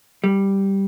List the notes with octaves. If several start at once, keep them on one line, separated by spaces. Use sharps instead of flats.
G3